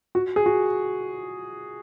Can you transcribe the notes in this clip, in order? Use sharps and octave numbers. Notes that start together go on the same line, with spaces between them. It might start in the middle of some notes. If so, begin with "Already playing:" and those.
F#4
G#4
F#4